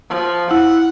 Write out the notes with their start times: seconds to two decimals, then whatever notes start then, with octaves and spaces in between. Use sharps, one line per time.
0.10 F3
0.51 E4 F#5